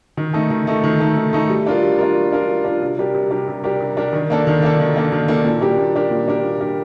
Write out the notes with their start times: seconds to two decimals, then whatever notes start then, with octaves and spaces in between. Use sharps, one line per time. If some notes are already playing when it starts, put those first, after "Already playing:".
0.17 D#3
0.34 A3 D#4 A4
0.51 D#3
0.67 A3 D#4 A4
0.84 D#3
1.00 A3 D#4 A4
1.17 D#3
1.33 A3 D#4 A4
1.50 G3
1.67 D4 F4 A#4
1.83 G3
1.98 D4 F4 A#4
2.16 G3
2.32 D4 F4 A#4
2.49 G3
2.64 D4 F4 A#4
2.82 C3
2.98 G3 D4 G4 A#4
3.14 C3
3.31 G3 D4 G4 A#4
3.48 C3
3.64 G3 D4 G4 A#4
3.80 C3
3.97 G3 D4 G4 A#4
4.13 D#3
4.30 A#3 D4 A4
4.47 D#3
4.62 A#3 D4 A4
4.80 D#3
4.96 A#3 D4 A4
5.12 D#3
5.28 A#3 D4 A4
5.45 A#2
5.61 G3 D4 G4 A#4
5.78 A#2
5.95 G3 D4 G4 A#4
6.11 A#2
6.28 G3 D4 G4 A#4
6.43 A#2
6.61 G3 D4 G4 A#4